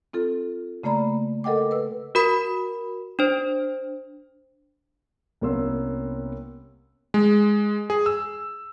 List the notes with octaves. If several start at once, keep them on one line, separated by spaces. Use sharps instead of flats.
C4 F4 A4
C#3 A3 A#3 D5 A#5 B5
A4 A#4 D#5 F#5 G5 D6
B4 E6
F#4 A#4 B5
D4 C5
C2 A#3 B3 C#4 C6 E6
G#3
G#4
E6